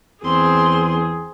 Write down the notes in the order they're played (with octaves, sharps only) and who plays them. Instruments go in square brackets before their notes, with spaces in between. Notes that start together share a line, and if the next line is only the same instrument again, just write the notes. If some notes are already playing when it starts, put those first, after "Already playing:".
[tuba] E2 [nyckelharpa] C4 [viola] G#4 [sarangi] C6